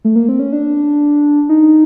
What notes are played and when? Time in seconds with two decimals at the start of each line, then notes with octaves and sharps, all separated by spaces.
0.05 A3
0.16 A#3
0.29 C4
0.40 C#4
0.53 D4
1.49 D#4